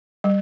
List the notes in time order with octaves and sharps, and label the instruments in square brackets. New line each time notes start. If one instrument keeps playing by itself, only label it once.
[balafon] G3